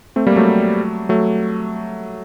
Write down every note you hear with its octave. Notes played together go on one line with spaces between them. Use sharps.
A3 C4
G3 A#3
F#3 A3
F#3 A3